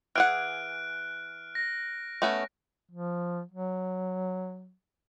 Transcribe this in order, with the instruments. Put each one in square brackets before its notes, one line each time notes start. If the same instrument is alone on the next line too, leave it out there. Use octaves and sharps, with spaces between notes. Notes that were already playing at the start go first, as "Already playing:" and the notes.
[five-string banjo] E3 G#4 F#5 [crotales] F6 F#6 D7
[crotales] A#6
[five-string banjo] A3 B3 C#4
[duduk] F3
F#3